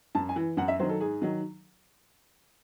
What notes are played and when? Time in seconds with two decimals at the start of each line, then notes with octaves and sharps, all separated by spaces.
0.15 F#2 A5
0.29 G#5
0.36 E3
0.57 F#2 F#5
0.68 E5
0.79 F#3 C5
0.83 D#3
0.89 A4
1.00 G#2 G#4
1.22 D#3 F#3